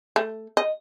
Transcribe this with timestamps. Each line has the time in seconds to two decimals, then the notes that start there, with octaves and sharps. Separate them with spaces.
0.16 A3
0.57 D#5